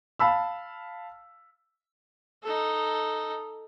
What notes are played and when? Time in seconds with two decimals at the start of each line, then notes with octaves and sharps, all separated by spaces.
0.19 F5 A5 B5 E6
2.43 D#4 A4